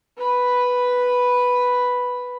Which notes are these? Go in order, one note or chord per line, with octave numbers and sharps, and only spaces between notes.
B4 B5